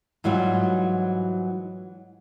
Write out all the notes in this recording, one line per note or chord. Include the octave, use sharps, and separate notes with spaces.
G#2 E3 F#3 G3 F4